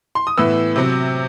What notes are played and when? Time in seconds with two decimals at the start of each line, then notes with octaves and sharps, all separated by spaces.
0.15 C6
0.27 D#6
0.38 A2 E3 B3 E6
0.76 C3 F#3 C4